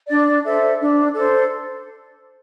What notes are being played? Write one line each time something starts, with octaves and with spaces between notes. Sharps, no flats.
D4 D5
A4 C5 E5
D4
A4 C5